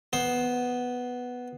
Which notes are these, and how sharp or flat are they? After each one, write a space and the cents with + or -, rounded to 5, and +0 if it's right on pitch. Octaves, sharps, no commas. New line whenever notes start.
B3 +0 C5 +10